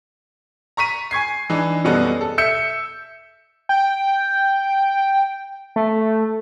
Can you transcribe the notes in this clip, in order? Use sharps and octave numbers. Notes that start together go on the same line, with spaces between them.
A#5 C#6 B6 D#7
G#5 C#6 G#6 C7
E3 D4 D#4
F#2 B2 G3 B3 A4 D#5
A4
E5 E6 G6 C#7
G5
A3